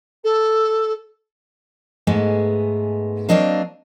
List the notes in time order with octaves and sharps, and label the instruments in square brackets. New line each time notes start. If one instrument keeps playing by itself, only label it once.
[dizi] A4
[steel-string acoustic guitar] G#2 G#3 A3 B3
F#3 A#3 C4 D4 D#5 F5